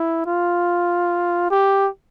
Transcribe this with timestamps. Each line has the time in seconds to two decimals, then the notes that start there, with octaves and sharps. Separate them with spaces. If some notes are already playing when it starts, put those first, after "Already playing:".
Already playing: E4
0.27 F4
1.51 G4